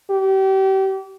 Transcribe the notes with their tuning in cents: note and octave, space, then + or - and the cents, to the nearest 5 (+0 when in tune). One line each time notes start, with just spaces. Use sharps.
G4 -35